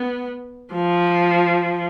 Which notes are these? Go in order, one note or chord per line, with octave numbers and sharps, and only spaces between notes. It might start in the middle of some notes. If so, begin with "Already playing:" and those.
Already playing: B3
F3